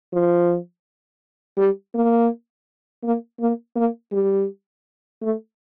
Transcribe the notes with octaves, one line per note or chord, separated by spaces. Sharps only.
F3
G3
A#3
A#3
A#3
A#3
G3
A3